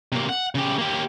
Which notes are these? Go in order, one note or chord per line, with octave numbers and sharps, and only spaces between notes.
C3 A#3
F#5
C#3 G4
A#3 G4